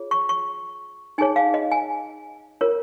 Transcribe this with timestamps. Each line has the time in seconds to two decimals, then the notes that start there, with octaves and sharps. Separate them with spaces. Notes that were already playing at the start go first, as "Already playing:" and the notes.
Already playing: F4 G#4 C#5
0.11 C#6
0.29 C#6
1.18 D#4 G#4 C#5 G#5
1.36 F5
1.54 D#5
1.72 G#5
2.61 F4 A#4 C#5